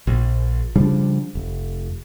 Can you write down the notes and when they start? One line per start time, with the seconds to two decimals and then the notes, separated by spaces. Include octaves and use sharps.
0.07 A#1
0.76 C#3 F3 G3 D4
1.35 F1